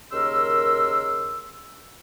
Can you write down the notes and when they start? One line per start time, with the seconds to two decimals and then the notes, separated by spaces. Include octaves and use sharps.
0.12 D#2 C#3 A#4 D#5 C6 E6